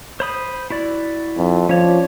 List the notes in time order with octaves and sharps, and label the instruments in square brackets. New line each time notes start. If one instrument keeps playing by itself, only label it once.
[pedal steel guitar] C5 B5 D#6
E4 F#4 D5
[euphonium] F2
[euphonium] F3 [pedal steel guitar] C#4 C#5 D5